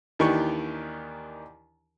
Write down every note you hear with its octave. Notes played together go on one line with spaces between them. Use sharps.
D#2 D#3 E3 D4 G4 C#6